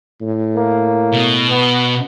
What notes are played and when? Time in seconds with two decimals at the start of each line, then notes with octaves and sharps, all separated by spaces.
0.22 A2
0.56 A#3
1.13 B2
1.49 B3